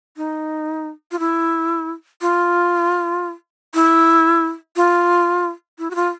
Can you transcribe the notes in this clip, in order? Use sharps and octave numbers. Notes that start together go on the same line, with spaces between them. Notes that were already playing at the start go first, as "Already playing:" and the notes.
D#4
F4
E4
F4
E4
F4
E4
F#4
F4